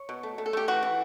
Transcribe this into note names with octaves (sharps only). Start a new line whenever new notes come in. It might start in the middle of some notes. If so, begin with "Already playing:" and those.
Already playing: C#5
B2
A3
A3
A4
A3 G4
E3 F#4
E3